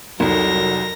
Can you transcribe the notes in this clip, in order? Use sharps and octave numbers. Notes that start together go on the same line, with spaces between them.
C2 F2 F#3 D#4 A4 A#4 A#6